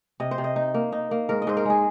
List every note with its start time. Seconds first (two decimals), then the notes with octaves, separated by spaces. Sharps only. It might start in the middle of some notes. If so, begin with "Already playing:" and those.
0.20 C3 D#5
0.31 C5
0.38 C3
0.44 D#5
0.56 D#4
0.74 A#3
0.92 D#4
1.11 A#3
1.29 G#2 A#4
1.42 D#5
1.47 G#2 C5
1.57 A#4
1.65 G#3 G#4